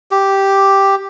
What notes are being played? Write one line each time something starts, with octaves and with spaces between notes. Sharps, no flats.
G4